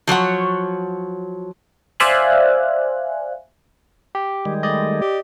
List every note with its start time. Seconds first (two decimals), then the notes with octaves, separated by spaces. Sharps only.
0.07 F3 F#3 C#5 F#5
2.00 C5 D5 E5 F5 G#5 F#6
4.15 G4
4.45 D#3 G3 G#3
4.63 A3 D5 D#5
5.01 G4